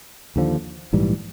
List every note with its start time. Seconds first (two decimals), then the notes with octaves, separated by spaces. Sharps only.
0.36 D#2 D3 F3
0.93 A#1 G#2 E3 G3